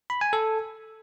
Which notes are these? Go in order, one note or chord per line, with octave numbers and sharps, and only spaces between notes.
B5
G#5
A4